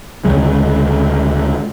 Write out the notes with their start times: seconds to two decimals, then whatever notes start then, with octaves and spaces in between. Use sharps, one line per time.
0.25 D2 C#3 G#3